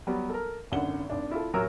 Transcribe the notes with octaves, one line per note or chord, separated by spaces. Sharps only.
F#3 G3 B3
A4 A#4
G#1 F#2 D3 F#5 G7
G#1 D4
E4 F4 A4
A1 F#3 A#4 E6